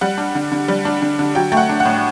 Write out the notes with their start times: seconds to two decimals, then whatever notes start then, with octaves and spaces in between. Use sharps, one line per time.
0.01 G3 F#5
0.18 D4
0.35 D3
0.52 D3
0.68 G3
0.85 D4
1.02 D3
1.19 D3
1.35 F#3 G5
1.52 A3 G5
1.57 F#5
1.69 D4
1.80 F#5
1.85 A2